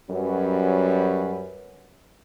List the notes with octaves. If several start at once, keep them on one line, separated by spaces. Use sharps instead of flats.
F#2 F#3 G3 C#4 B4